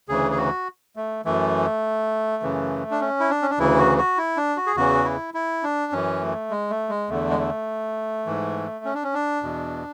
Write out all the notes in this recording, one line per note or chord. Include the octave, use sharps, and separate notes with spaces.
D2 C#3 E3 G#4
G#4
F#4
A3
F#2 E3 A3
F#2 C#3 E3
D4
C#4
E4
D4
C#4
D4
D2 C#3 E3 E4
F#4
F#4
E4
D4
F#4
G#4
E2 C#3 E3 F#4
E4
E4
D4
F#2 E3 C#4
A3
G#3
A3
G#3
E2 D3 A3
G#3
A3
G#2 E3
C#4
D4
C#4
D4
E2 B2